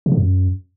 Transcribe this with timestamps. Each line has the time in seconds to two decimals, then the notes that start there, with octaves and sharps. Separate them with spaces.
0.06 C#3
0.12 D3
0.17 F#2